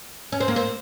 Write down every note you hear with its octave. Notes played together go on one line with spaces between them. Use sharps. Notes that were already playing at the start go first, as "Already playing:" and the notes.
C#4
C4
A#3
C4